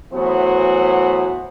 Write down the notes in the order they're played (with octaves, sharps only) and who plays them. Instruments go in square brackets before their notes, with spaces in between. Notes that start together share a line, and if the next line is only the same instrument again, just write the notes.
[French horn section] E3 F#3 A3 B3 F#4 C5